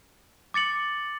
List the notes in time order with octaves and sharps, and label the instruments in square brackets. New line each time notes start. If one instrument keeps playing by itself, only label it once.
[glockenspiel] D6 A6 C#7 F#7